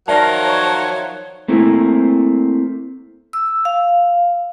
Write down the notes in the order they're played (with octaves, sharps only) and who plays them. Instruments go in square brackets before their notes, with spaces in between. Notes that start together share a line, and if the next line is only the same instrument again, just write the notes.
[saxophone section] D#3 F3 F#3 [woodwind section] A#4 [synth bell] D5 E5 A5
[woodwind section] C#5
[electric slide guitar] A3 A#3 C4 E4
[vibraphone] E6
F5